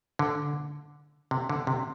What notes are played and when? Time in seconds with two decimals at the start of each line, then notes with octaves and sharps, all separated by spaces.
0.19 D3
1.31 C3
1.50 D3
1.67 C3